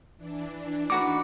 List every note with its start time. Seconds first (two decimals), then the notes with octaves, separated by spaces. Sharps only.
0.17 E3 D4
0.90 D#4 F#4 B4 D6